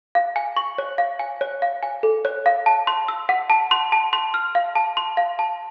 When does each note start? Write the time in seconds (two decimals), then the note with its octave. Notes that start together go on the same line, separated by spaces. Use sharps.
0.15 F5
0.36 G#5
0.56 C#6
0.78 C#5
0.98 F5
1.19 G#5
1.41 C#5
1.62 F5
1.83 G#5
2.03 A4
2.25 C#5
2.46 F5
2.66 A5
2.87 C6
3.08 E6
3.29 F#5
3.50 A5
3.71 C6
3.92 A5
4.13 C6
4.34 F6
4.55 F5
4.75 A5
4.97 C6
5.17 F5
5.39 A5